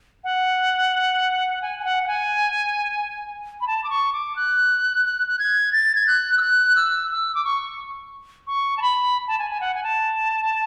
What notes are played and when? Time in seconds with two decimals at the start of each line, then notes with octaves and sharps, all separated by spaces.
0.24 F#5
1.62 G#5
1.79 G#5
1.84 F#5
2.03 F#5
2.07 G#5
3.61 B5
3.67 A5
3.84 D6
3.90 C#6
4.13 D6
4.36 F#6
5.05 F#6
5.27 F#6
5.39 G#6
5.73 A6
5.95 G#6
6.07 F#6
6.38 E6
6.41 F#6
6.76 E6
7.10 E6
7.35 D6
7.44 C#6
8.47 C#6
8.77 A5
8.82 B5
9.28 A5
9.38 G#5
9.51 G#5
9.61 F#5
9.75 G#5
9.83 A5